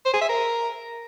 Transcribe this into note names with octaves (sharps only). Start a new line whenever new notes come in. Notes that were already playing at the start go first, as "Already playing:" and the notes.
C5
G#4
E5
A#4